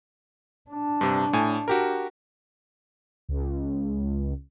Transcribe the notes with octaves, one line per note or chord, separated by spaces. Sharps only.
D4
G2 C3
A2 G#5
F#4 G4 A#4
C#2